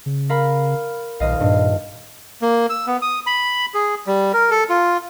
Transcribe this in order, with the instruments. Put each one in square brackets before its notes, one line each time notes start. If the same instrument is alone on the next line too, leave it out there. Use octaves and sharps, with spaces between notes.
[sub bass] C#3
[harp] A#4 F5 B5
[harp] D#1 D#5 F5 [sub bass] B1
[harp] G2 [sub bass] A#2
[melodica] A#3
E6
B3
D#6
B5
G#4
G3
A#4
A4
F4